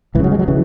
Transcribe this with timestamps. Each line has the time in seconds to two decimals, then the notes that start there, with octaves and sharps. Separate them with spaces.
0.15 C#2 E3
0.19 C#3 F#3
0.32 G#3
0.39 F#3
0.48 C#3 E3